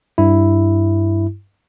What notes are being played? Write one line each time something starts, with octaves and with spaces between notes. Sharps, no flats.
G2 E4